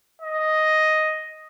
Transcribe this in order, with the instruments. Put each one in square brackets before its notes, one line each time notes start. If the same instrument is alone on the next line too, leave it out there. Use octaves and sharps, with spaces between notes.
[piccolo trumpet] D#5